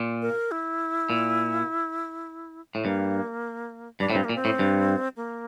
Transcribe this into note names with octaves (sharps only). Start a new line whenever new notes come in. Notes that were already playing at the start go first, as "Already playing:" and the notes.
Already playing: A#2
A#4
E4
A#2
A2
G2 A#3
G2 D4
A2
G2 C4
A#3
A#2
C4
A2
G2
A#3